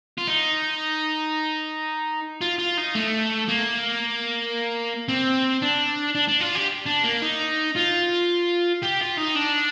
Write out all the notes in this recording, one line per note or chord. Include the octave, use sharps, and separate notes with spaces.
F4
D#4
F4
F4
D#4
A3
A#3
C4
D4
D4
D4
F4
G4
D4
A#3
D#4
F4
G4
F4
D#4
D4